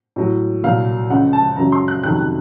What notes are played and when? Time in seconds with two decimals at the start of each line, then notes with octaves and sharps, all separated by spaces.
0.16 A2 F#3
0.64 C2 A#2 F#3 F5
1.10 C#2 C#3 F3 F#5
1.33 A5
1.56 F#2 C#3 F#3 A#5
1.72 C6
1.88 F#6
2.03 F2 C3 D#3 F#3 F#6